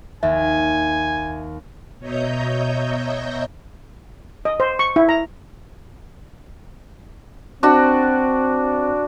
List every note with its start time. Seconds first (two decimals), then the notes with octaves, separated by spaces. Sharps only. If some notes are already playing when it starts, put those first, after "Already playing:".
0.23 D#2 E5 G#5
1.99 B2 C#5 D#5 E5 A#5 G6
4.45 D#5
4.60 C5
4.79 C#6
4.96 E4
5.09 A#5
7.63 C4 D4 F#4